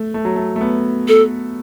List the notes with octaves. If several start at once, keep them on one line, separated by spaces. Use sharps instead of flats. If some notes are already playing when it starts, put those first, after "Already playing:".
Already playing: A3
A3
F#3
A3
A3
B3
A4